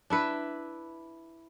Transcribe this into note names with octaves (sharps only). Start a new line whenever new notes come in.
D4 E4 B4